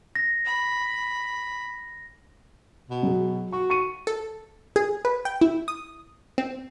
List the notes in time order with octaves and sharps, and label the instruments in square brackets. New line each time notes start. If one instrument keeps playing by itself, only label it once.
[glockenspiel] A#6
[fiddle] B5
[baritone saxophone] B2
[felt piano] F#3 G#4
[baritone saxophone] F#4 [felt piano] C#6
[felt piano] C#6 C#7 D#7
[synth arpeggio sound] A4
G#4
B4
G5
E4
D#6
C4